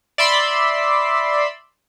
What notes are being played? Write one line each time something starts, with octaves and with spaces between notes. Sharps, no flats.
D5 E5 B5 C6 E6